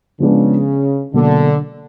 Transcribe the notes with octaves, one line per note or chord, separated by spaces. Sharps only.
C#3 F3 G#3 B3 D4
B2 D3 F#3 A#3